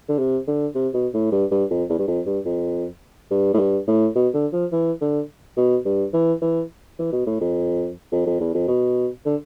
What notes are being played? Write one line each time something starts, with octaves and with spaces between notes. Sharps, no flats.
D3
C3
D3
C3
B2
A2
G2
G2
F2
E2
G2
F2
G2
F2
G2
A2
G2
A2
B2
D3
F3
E3
D3
B2
G2
E3
E3
E3
B2
A2
F2
F2
F2
E2
F2
B2
D3